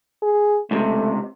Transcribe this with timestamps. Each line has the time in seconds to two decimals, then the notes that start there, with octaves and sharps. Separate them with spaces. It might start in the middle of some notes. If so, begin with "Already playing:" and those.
0.23 G#4
0.71 C#2 A2 C3 A3